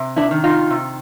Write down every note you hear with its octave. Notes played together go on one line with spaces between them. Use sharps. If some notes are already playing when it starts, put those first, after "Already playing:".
Already playing: C3
D4 E4
D#3
D#4 F4
C3